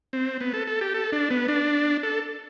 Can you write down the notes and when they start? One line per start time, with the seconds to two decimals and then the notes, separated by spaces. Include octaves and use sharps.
0.13 C4
0.41 B3
0.54 A4
0.67 A4
0.81 G4
0.94 A4
1.12 D4
1.31 B3
1.48 D4
2.03 A4